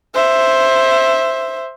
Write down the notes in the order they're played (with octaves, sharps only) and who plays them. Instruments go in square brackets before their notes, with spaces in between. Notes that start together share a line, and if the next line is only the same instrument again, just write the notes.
[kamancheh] C5 E5